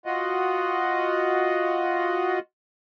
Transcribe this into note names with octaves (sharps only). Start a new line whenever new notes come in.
F4 F#4 D#5